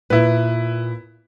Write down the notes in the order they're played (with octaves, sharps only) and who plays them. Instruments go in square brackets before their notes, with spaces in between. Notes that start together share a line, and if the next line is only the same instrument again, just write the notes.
[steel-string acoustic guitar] A#2 [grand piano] E4 B4